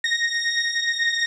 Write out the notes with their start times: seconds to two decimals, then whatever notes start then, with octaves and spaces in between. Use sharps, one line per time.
0.04 A#6